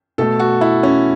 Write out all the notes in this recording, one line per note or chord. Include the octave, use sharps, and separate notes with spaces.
B2 A3 A4
F#4
E4
C#4